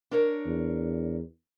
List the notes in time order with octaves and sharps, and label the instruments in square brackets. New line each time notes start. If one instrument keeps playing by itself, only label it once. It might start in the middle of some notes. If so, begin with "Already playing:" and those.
[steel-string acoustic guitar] D4 A#4 C#5
[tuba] E2